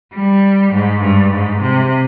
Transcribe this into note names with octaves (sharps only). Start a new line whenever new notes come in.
G3
G#2
G2
G#2
C3